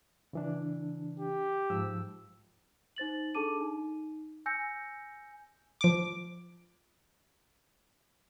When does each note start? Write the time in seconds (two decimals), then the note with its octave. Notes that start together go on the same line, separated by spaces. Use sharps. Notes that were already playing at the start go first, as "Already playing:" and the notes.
0.33 C#3 E3 D4
1.20 G4
1.70 G#2 F3 E6
2.96 D#4 C5 A6 F#7
3.35 D4 G#4 A4 A5 D6 D#7
3.61 D#4
4.46 G#5 E6 G6 A#6 C#7
5.81 F3 D6